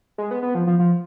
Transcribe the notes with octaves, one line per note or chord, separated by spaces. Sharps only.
G#3
B3
B3
F3
F3
F3